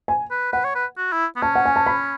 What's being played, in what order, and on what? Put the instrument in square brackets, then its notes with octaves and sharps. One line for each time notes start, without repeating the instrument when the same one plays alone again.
[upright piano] G#5
[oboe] B4
[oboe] B4 [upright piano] F#5
[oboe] C#5
B4
F#4
E4
B3
[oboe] C#4 [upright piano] A5
[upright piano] F#5
G#5
A5
B5